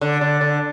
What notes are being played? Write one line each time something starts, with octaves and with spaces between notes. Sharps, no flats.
D3
D3
D3